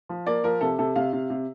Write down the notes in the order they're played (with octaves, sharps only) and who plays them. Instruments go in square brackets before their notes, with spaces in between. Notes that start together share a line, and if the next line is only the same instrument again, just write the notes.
[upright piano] F3
A#3 D5
F3 A#4
C3 A4
C3 A4
C3 F5
C3
C3